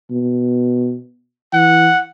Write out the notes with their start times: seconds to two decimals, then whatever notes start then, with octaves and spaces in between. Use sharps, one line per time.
0.11 B2
1.53 E3 F#5